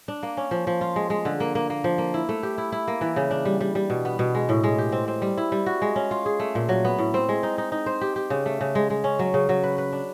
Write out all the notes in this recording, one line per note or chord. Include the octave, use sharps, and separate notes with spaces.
D4
A#3
C#4
F3
F3
F4
G#3
G#3
D3
A#3
A#3
A#3
F3
A#3
E4
A3
G4
E4
E4
A#3
E3
C#3
D4
G3
G3
G3
B2
B3
B2
G#3
A2
G#3
G4
C4
C4
G3
E4
G3
F#4
G#3
C#4
F4
G#4
A3
A#2
F#3
B3
A2
C4
G#3
D#4
D#4
D#4
C5
G4
G4
C#3
A3
C#3
G#3
G#3
C#4
F#3
C#3
F#3
B4
B4
D4